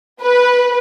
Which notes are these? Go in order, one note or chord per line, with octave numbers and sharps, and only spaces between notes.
B4